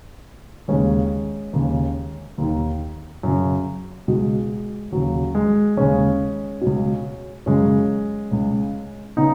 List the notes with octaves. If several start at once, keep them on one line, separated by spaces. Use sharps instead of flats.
D#2 C#3 G#3 C#4
D#2 C#3
D#2 D#3
F#2 C#3
C#2 B2 G#3
D#2 C#3 F#3
G#3
D#2 C#3 G#3 C#4
C#2 B2
F#2 C#3 G#3 C#4
C#2 C#3
C#3 B3 D#4